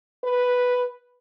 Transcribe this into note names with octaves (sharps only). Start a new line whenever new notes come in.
B4